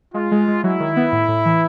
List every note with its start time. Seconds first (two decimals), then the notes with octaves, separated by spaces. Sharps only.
0.14 G#3 F4
0.31 G#3
0.48 G#3
0.64 F#3 E4
0.80 D#3
0.96 B3
1.12 A2
1.28 A2
1.45 E3